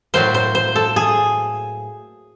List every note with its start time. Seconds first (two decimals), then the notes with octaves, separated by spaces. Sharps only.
0.14 A2 F#3 A#3 C5
0.34 C5
0.55 C5
0.76 A4
0.96 G#4